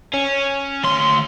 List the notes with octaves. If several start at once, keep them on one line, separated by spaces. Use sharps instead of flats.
C#4
D2 C6